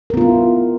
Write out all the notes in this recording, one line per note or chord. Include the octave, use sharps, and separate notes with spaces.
B3 E4 F4 A#4